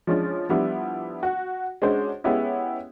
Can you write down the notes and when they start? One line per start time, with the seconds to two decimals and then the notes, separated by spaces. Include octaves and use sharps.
0.07 F3 G#3 C#4 D4 F4
0.49 F3 G3 B3 D4 E4
1.23 F#4
1.82 G#3 C#4 D4 F#4 C5
2.24 G#3 B3 C#4 E4 G4